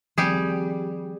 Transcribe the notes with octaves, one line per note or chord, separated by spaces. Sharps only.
D#3 F3 G3 C4 G4 G#4